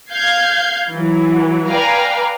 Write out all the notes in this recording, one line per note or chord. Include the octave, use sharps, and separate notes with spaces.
F5 G6 G#6 C7
E3 F#3
B4 D5 F5 G5 G#5 A#5